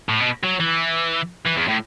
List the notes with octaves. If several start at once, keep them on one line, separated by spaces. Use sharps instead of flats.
A2
B2
F#3
E3
E3
E2
A2